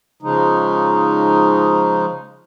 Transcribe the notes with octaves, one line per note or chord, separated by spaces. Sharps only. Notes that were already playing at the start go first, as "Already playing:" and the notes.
C#3 F3 G#3 D#4